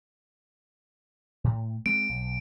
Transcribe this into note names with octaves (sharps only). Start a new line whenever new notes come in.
A2
G#3 C4 D7
B1